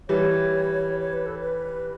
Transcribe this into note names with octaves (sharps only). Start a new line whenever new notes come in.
E3 G3 C#5
C#5
B4
A4
B4